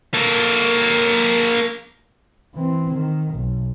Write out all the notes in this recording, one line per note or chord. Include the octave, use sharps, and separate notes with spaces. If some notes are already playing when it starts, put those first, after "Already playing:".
A#3 A4
E3 C4
D#3
B1